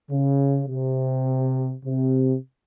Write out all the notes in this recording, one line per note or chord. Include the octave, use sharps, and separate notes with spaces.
C#3
C3
C3